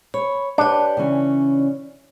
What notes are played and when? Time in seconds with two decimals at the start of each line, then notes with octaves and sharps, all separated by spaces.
0.14 C#5 B5
0.58 D4 G4 B4 C#5 D5
0.97 C#3 E3 C#4